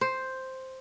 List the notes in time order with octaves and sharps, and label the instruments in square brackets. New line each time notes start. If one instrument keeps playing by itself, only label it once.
[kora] C5